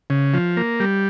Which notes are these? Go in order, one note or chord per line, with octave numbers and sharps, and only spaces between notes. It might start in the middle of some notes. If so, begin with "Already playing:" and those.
C#3
F3
A#3
G3